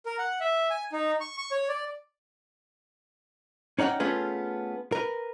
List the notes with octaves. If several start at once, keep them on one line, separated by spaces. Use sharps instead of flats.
A#4
F#5
E5
G#5
D#4
C#6
C#6
C#5
D5
C#4 D#4 D5 F#5 G5
A3 B3 C#4 F4 G#4 B4
A#4 B4